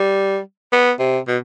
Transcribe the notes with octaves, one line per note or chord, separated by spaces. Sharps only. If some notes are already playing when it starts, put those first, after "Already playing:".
Already playing: G3
B3
C3
B2